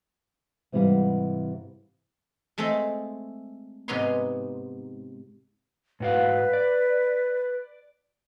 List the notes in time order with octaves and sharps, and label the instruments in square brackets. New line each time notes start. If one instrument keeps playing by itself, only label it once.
[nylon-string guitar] G#2 C3 E3 G3 F5 F#5
[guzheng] G#3 A3 C4 A4 C5
G#2 C3 B3 D#4 C#5 C6
[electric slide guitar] G#2 F#4 F5 [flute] B4
[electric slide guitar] D5